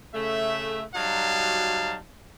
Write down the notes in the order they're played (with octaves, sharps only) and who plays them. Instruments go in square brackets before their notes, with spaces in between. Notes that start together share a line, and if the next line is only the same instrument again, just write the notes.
[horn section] C#3 A3 E5
F#3 G3 D#4 F#4 F5 A5